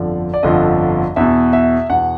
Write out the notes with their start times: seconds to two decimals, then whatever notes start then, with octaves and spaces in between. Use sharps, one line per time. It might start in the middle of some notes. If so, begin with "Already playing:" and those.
Already playing: G1 F2 D3 F3 D5
0.34 D5
0.43 G1 F2 D3 F3 D#5
1.16 E2 B2 E5
1.53 E5
1.90 E2 B2 F#5